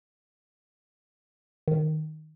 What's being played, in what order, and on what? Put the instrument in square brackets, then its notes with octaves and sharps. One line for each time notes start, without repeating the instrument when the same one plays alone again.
[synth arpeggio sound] D#3